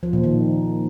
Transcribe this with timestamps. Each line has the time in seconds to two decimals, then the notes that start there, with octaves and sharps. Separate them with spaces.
0.03 F3
0.13 A#2
0.24 D#3